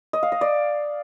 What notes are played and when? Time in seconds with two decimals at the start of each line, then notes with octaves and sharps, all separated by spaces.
0.13 D#5
0.23 F5
0.32 D#5
0.41 D5